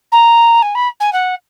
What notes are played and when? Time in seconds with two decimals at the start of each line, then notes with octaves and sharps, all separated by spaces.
0.12 A#5
0.62 G#5
0.75 B5
1.00 G#5
1.13 F#5